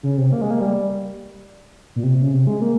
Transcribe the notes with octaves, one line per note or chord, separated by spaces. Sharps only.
C#3
C3
A#3
G#3
A#3
G3
A#2
C3
C#3
C3
G#3
A#3